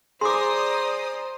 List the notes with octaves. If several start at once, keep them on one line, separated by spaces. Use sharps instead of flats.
G#4 C5 D5 A#5 C6 D6 D#6